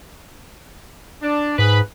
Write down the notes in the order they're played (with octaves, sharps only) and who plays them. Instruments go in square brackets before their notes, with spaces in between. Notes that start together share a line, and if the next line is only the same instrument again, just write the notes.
[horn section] D4
[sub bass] G#2 [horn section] G#4 B4 B5